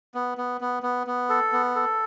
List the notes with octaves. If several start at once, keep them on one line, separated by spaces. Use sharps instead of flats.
B3
B3
B3
B3
B3
A4
B3
A4